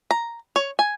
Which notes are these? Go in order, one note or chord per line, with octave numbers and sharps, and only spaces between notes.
A#5
C#5
G#5